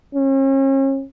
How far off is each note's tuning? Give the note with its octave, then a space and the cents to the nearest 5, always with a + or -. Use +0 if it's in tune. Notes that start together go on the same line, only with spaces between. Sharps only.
C#4 -40